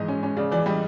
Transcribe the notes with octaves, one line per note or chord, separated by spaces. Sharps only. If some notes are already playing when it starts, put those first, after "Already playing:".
Already playing: G#2 E3 D#5
C#4
C#4
C#3 D5
E3 D5
G3 D#5